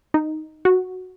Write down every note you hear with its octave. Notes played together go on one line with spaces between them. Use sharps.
D#4
F#4